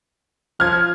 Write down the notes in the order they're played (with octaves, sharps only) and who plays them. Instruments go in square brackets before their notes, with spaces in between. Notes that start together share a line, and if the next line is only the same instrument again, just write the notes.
[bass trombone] F3 [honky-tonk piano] F6 G#6